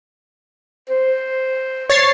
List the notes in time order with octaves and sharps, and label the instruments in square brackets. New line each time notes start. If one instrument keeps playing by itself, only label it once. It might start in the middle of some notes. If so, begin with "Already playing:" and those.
[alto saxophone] C5
[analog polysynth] C#5 A6 C7